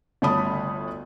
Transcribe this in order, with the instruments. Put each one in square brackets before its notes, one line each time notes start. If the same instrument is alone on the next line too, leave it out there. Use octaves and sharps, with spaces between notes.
[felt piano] G1 D2 C#5 A5 B5 D#6